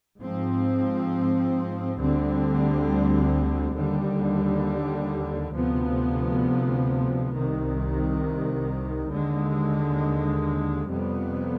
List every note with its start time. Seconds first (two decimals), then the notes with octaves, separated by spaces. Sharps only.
0.20 G#2 F3 C4
1.98 D2 D3 G3 C4
3.76 D#2 D3 G3
5.54 D2 C3 F3 B3
7.34 C2 C3 D#3
9.12 D#2 D3 G#3
10.89 F2 C3 G3 B3